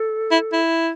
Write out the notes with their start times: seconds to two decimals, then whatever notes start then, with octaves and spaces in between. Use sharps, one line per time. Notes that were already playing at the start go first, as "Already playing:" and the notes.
Already playing: A4
0.31 E4
0.52 E4